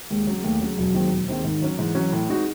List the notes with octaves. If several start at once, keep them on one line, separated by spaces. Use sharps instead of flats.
D#2 G#3
C#3 F#3
D#2 A3
C#3 F#3
E1 F#3
D#2 D#3 G#3 C4
E1
D#2 D#3 G#3 C4
G#2 D#3
F#3 C#4
G#2 E3
F#3 C#4
A2
G#3 C4 D#4 F#4